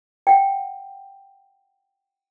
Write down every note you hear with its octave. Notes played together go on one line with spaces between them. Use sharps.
F#5 G5